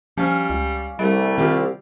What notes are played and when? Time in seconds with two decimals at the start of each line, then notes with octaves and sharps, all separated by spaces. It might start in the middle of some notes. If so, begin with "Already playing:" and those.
0.18 F3 G3 C#4 F5 G#5
0.50 C#2
0.99 C2 G3 A3
1.38 D#3 C4 F4 G4